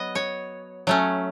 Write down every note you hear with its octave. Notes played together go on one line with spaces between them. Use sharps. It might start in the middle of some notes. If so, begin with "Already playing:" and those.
Already playing: F#3 B3 D#5 F#5
C#5
F#3 A3 C#4